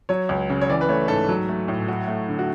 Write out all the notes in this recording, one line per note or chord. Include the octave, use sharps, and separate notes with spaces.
F#3 C#5
C#2
C#3
C#5
E3 D5
B4
A3 C#5
G#2 A4
F#3
A3
A2
F#3 F#4
A3
D3
F#4